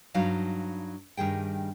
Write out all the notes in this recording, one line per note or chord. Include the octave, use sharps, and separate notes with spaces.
G2 F#3 D#4 F5 A5
G2 D#3 G3 G#4 G5